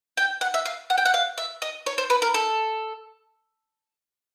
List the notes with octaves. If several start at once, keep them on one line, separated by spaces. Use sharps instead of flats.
G5
F#5
E5
F5
F#5
G5
F#5
F5
E5
D#5
C#5
C5
B4
A#4
A4